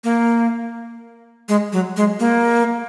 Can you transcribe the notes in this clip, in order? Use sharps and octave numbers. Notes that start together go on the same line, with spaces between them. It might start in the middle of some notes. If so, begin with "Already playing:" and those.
A#3
G#3
F#3
G#3
A#3